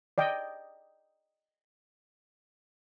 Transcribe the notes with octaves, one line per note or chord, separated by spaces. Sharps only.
D5 D#5 G5